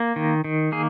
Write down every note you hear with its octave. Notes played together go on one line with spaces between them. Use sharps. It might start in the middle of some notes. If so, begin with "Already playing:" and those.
Already playing: A#3
D#3
D#3
A#3 G#4